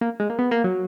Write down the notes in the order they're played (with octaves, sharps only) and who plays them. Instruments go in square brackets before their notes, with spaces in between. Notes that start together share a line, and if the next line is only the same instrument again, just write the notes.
[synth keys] A#3
G#3
A#3
B3
A#3
F#3